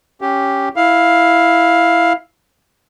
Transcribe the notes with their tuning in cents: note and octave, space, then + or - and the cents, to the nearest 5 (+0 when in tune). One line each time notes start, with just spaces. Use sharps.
C#4 +0 G4 +0
E4 +0 F5 +10